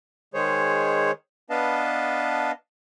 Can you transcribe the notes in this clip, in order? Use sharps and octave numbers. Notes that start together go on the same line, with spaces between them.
D#3 G#3 G#4 C5 C#5
B3 D4 B4 D#5 F5 A5